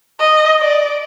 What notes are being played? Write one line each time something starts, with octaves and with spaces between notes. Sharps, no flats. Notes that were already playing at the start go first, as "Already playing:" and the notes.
D#5
D5